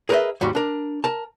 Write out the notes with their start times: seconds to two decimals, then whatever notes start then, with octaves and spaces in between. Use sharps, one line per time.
0.09 G#4 A#4 B4 C#5 D#5 E5
0.41 D#2 G#2 G3 F#4
0.55 D4 A#4
1.04 A#4 A5